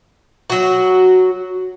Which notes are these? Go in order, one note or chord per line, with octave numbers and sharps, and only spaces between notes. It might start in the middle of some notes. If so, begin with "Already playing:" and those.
F#3 F#4